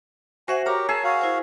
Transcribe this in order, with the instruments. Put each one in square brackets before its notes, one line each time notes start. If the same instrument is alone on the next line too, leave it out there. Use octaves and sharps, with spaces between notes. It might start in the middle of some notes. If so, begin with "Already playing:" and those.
[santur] F#4 [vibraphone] C5 E5 F#5 [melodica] G#5
[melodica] G4 [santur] A#4 [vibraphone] C#5 A#5
[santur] G#4 E5 [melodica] A5
[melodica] F#4 F5
[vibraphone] E4 C5